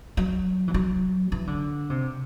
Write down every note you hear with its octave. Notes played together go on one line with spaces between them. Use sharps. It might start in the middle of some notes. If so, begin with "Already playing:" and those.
F#3
E3
F#3
E3
D3
C3